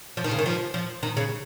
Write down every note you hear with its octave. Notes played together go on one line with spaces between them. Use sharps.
F3
D#3
C#3
D#3
F3
F3
D#3
C#3